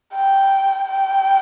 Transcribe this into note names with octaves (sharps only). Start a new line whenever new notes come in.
G5
G5